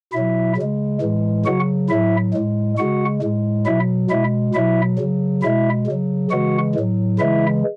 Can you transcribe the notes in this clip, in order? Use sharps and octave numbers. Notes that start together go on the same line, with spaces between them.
B2 F#3 E4 E5
C#3 G#3
A2 E3 G#3
C#3 F#3 F#4 F#5
A2 F#3 E4 E5
A2 G#3
C#3 G#3 F#4 F#5
A2 G#3
B2 F#3 E4 E5
B2 G#3 E4 E5
B2 F#3 E4 E5
C#3 F#3
B2 G#3 E4 E5
C#3 F#3
C#3 E3 G#3 F#4 F#5
A2 F#3
C#3 E3 G#3 E4 E5